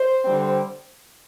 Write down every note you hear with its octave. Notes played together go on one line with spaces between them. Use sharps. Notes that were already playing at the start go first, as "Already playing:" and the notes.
Already playing: C5
D3 G3 C4